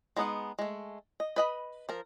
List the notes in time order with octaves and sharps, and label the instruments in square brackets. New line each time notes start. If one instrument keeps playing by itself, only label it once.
[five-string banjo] G#3 B3 D#4 F#4 F#5
G#3 A3
D#5
B4 D#5 B5
F3 A#4